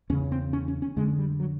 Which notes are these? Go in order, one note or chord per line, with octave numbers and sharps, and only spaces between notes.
E2 C#3 C#4
C4
C#4
C#4
C#4
F2 D3 G#3
G3
F#3